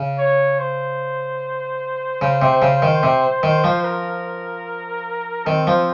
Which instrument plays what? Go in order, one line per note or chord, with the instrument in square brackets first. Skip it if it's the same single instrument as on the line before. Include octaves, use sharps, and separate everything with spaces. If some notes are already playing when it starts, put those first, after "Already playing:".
Already playing: [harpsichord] C#3
[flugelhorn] C#5
C5
[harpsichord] C#3
C3
C#3
D#3
C3
D#3
F3
[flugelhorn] A#4
[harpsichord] D#3 [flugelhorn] C4
[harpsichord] F3